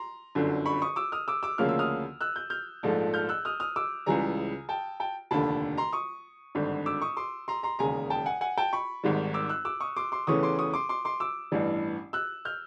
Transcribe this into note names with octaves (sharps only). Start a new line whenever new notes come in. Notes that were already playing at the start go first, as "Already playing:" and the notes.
Already playing: A#5 C6
G1 F#2 D3
B5 C#6
C#6 D#6
D6 E6
D#6 F6
D6 E6
D6 E6
D2 C#3 F3 A#3 C#4 F6
E6
D#6 F6
E6 F#6
G6
F6 G6
A#1 G#2 F3 A3
F6 G6
E6 F#6
D#6 F6
D#6 F6
D6 E6
C#2 C#3 E3 G3 G#5 A#5
G5 A5
G5 A5
F1 D#2 D3 A5 B5
A#5 C6
C#6 D#6
G#1 G2 D3
D6 E6
C#6 D#6
C6 D6
A#5 C6
A#5 C6
E1 D#2 C#3 G#5 A#5
G5 A5
F#5 G#5
F#5 G#5
G5 A5
B5 C#6
G#1 G#2 D#3 G3
D6 E6
E6 F#6
D6 E6
C#6 D#6
C6 D6
C6 D6
E2 C#3 E3 A3 C#4 C#6 D#6
C6 D6
C#6 D#6
C6 D6
C6 D6
C6 D6
D6 E6
A1 G2 E3 G3
E6 F#6
F6 G6